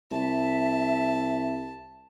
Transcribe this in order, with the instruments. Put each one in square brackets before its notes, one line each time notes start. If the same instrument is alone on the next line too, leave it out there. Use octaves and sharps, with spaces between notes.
[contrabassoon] C2 [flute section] E5 [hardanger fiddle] A5